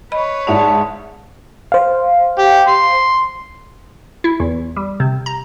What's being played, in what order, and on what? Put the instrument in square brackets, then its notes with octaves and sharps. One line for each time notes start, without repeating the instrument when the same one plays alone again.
[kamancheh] B4 C#5 [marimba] D#5 B5
[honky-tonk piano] G#2 E5 F7 [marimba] D5 [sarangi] A5
[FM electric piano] C5 F5
[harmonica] G4
C6
[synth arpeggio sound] E4
E2
G3
C3
A#5